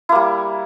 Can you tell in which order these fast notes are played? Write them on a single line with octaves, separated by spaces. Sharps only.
E4 A#3 G3